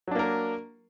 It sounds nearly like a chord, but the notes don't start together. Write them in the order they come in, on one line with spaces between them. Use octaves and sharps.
F#3 D4 A#3 A#4